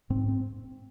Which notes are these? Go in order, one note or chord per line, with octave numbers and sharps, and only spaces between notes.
G#2 C4
C4